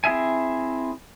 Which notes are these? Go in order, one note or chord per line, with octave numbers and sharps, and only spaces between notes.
C4 E4 G#4 E5 G#5